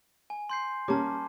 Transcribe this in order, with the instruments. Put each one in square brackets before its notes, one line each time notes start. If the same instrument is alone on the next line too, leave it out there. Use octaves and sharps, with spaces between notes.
[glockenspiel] G#5
C6 G6 C7
[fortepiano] G3 A#3 C#4 [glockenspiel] A5 D6